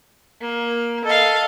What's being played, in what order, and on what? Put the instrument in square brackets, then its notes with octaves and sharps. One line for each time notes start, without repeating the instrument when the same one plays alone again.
[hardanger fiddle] A#3
[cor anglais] A4 [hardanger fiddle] D#5 F5